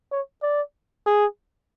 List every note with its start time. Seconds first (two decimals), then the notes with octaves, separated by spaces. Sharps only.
0.11 C#5
0.42 D5
1.06 G#4